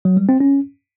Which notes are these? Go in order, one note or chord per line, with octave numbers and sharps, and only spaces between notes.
F#3
G3
C4
C#4